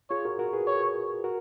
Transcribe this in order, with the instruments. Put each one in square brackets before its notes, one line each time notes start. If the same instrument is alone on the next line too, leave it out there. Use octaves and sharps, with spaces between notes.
[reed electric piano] F4 G#4 [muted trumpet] C#5
[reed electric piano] F#4 A#4
F#4 A#4
G#4 B4
[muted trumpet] C#5
[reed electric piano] F#4 A#4